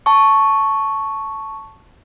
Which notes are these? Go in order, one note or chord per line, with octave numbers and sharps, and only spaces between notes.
A5 C#6